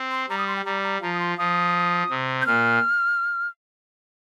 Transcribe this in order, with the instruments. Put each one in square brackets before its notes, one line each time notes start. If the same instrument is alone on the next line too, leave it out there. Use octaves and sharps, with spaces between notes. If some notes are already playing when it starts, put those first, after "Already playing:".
Already playing: [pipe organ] C4
[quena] C6
[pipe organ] G3 [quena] A#5
[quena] D#6
C6
G5
[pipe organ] G3 [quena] A#5
[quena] A#5
[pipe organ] F3 [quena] A#5
[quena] D#6
C6
[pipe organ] F3 [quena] D#6
[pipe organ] C3
[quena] G6
[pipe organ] A#2 [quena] F6